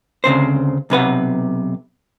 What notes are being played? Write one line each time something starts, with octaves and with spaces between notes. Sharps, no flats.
D2 C#3 C4 C5
B1 C3 B4 F#5